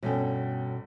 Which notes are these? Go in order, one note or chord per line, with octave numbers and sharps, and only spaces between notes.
G1 B2 C#4 A4 G5